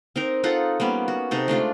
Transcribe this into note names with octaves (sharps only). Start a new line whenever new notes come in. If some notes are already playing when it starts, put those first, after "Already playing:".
C4 D#4 A#4
D#4 F4 A4 F#5
G3 A#3 B3 C#4
F#4
C3 D#4 A4
G#3 A3 D4 F4